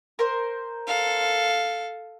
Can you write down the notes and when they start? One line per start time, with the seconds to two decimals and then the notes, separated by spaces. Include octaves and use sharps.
0.19 A#4 C5
0.87 A4 F5